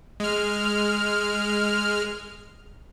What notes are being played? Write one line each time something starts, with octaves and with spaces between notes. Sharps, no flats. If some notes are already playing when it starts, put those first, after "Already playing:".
G#3 F6